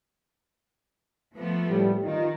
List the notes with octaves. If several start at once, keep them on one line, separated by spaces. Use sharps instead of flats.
F3 A3 B3
A2 G3
D#3 D#4 F4